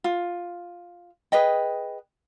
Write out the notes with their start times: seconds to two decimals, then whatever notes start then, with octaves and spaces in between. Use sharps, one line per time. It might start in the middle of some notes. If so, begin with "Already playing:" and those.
0.04 F4
1.32 G#4 B4 D#5 G5